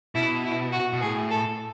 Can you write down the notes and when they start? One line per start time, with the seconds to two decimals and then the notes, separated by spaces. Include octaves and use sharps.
0.15 B2 E4
0.44 E4
0.73 F#4
0.93 B2
1.01 A2 G#4
1.30 A4